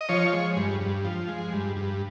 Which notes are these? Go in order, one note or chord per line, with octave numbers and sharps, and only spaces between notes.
D#5
F3 C#5
G#3
G2
G2
F3
G#3
G2
G2